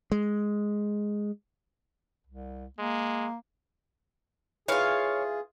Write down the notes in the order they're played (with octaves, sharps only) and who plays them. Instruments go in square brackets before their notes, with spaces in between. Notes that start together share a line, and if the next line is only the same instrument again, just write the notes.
[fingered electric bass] G#3
[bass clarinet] C2
[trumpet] G#3 [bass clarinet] A#3
[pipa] E3 F4 [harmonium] G#4 [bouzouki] C#5 F5